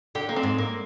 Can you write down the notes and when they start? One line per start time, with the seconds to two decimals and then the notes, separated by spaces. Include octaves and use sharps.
0.15 D3 G4
0.29 A#3
0.36 C4
0.43 G#2
0.58 A#3